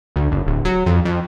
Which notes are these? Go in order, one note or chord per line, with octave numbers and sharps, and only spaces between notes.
D2
F#1
D1
F#3
F2
F2